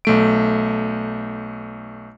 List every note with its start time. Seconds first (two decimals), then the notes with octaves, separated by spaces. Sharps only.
0.05 B1 A3 D7